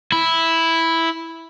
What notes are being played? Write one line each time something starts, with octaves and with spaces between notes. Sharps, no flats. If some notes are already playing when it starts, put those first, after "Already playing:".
E4